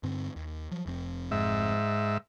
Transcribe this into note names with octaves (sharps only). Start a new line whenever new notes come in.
G2 D3 C4
D#2
F3 F#3
F1 F2 C4
G#2 E5